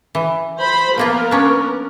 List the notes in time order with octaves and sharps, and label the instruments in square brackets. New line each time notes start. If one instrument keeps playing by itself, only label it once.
[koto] E3
[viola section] C5 B5
[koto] F3 A#3 F4 [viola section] B3 A#4
[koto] C#4 D4